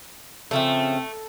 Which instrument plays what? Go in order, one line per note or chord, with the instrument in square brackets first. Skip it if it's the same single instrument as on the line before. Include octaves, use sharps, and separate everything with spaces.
[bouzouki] C#3 F3 E5 [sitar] A3 [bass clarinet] C4